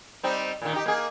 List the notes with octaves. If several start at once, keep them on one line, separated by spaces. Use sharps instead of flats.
G3 C4 D#4
A#2 D#3
D#4 G4
A#3 G#4